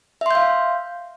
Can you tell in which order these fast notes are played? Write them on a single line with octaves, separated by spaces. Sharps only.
E5 C6 G6 F5